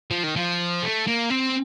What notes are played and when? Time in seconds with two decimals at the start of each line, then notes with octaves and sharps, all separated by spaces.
0.11 F3
0.24 D#3
0.36 F3
0.83 A3
1.07 A#3
1.30 C4